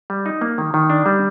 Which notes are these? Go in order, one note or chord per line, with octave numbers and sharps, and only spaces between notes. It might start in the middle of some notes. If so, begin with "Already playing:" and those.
G3
D#4
A#3
D#3
D#3
D4
G3